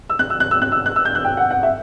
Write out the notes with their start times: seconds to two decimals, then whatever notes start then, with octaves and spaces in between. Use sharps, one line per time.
0.10 E6
0.19 F#6
0.30 E6
0.40 F#6
0.51 E6
0.62 F#6
0.72 E6
0.86 F#6
0.96 E6
1.05 G6
1.15 F#6
1.24 G5
1.37 F#5
1.51 F#5
1.63 E5